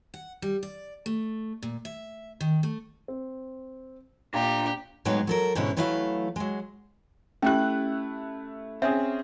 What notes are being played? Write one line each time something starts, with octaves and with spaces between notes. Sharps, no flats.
F#5
G3
D5
A3
A#2
E5
D#3
A3
C4
A#2 D4 G4 A#5
A2 F#3 G#3 B3 D#4
F#3 A4 A#4
G#2 B2 D3 C#4 E4
E3 F#3 A3 E4 E5 F5
F#3 G#3
A3 C#4 E4 G4 F#6
C4 C#4 G#4 E5